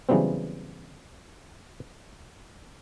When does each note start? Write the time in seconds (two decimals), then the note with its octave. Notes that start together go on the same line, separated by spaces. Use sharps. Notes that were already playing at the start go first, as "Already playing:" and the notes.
0.09 C#3 E3 F#3 G3 B3 C4